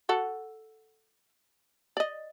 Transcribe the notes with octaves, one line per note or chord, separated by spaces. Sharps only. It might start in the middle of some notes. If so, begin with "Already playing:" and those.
F#4 A4 F#5
D5 D#5